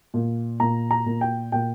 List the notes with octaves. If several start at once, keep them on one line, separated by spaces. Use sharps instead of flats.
A#2
A#2 A#5
A#5
A#2
G5
A#2 G5